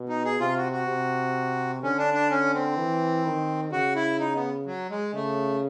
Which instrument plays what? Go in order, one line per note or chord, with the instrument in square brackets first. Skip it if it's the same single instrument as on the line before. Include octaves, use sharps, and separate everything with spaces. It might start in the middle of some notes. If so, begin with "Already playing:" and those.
Already playing: [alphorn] B2
[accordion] D#4
G#4
[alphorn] C3 [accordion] F4
[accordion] F#4
F#4
[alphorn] C3
[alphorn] D3 [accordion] C#4
[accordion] D4
D4
C#4
C4
[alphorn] E3
D#3
[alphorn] C#3 [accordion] F#4
[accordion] E4
D#4
B3
F#3
G#3
[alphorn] C#3 [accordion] A3